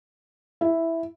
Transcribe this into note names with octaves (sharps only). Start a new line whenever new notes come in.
E4